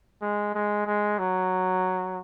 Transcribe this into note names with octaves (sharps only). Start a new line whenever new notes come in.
G#3
G#3
G#3
F#3